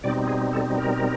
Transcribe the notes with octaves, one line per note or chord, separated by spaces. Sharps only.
B2 G3 C4 D#4 D5
G#4
A4
A#4